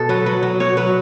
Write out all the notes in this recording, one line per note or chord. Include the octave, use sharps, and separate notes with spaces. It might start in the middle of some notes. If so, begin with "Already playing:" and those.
Already playing: B2 A4
F#3 B4
F#3 B4
F#3
B2 C#5
F#3 B4